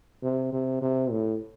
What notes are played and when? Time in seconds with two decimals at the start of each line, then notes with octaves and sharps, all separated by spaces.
0.23 C3
0.52 C3
0.82 C3
1.11 A2